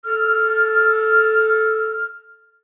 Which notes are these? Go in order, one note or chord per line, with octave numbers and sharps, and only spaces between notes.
A4 F6